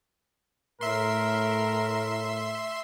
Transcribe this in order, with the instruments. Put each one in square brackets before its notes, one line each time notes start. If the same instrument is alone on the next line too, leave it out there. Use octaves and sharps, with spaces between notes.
[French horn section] A2 [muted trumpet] A#4 [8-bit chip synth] E5 C6